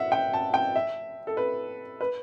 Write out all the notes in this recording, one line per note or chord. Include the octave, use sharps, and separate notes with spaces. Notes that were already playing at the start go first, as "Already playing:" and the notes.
Already playing: E5 F#5
G5
A5
G5
E5
A4
B4
B4